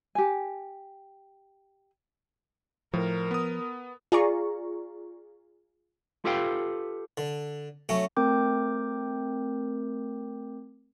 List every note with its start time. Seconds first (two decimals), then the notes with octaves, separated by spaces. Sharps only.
0.15 G4 G#5
2.93 A2 F3 A#4
3.31 B3 D#6
4.12 F4 G#4 D5 A#5 C#6
6.25 F4 G4 A4 B4 F5 G5
7.17 D3
7.89 F#3 A3 C#4
8.17 A3 C4 A#4 G5 D6 G6